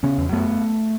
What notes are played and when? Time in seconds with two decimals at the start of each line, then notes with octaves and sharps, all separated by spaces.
0.03 C#3 B3 C#4
0.18 E2
0.33 F#2 A3 B3